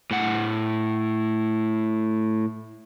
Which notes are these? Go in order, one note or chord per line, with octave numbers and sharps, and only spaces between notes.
A2 F#5